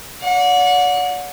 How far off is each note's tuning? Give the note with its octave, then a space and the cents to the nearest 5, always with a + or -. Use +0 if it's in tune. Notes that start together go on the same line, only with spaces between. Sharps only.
D5 -40 F#5 -30